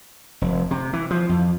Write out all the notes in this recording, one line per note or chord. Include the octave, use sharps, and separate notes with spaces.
F1
C3
E3
F3
F2